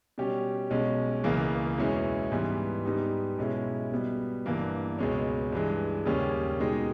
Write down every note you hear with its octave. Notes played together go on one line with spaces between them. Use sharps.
B2 G3 C#4 G4
B1 B2 G#3 C#4
C#2 C#3 E3 A#3
E2 B2 G#3 C#4 E4
G#2 E3 G3 B3
G#2 G3 B3 D#4 G4
B1 B2 G#3 C#4 E4
B2 G3 B3
G1 G2 E3 A#3
C#2 B2 G#3 C#4
G2 E3 G#3
D#2 C#3 G3 C#4
B2 G#3 D#4 G4